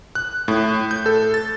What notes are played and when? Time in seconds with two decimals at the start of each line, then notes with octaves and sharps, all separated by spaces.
0.15 F#6
0.48 A2
0.91 G6
1.06 A4
1.34 A6